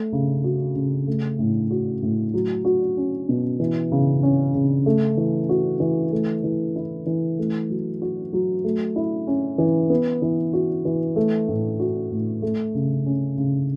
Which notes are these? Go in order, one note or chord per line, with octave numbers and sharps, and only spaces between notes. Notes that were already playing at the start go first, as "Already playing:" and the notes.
Already playing: A3
C#3
F#4
C#3
A3
A2
F#4
A2
F#3
F#4
C#4
B2
E3
C#3
C#4
C#3
A3
E3
F#4
E3
A3
E3
E4
E3
A3
F#3
F#4
F#3
A3
E4
C#4
E3
B3
E3
F#4
E3
A3
A2
F#4
A2
A3
C#3
C#4
C#3